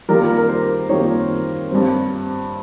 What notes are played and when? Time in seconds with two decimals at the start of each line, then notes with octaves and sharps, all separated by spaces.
0.08 D#3 G3 A#3 F4 A#4
0.38 A#4
0.49 C5
0.89 D#3 G3 A#3 F4 C#5
1.70 G2 G3 C4